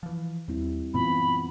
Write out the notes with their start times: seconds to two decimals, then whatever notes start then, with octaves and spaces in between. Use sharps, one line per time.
0.03 E3 F3
0.48 D#2 G3 C4 E4
0.94 F#2 A#2 E3 B3 C4 F4 B5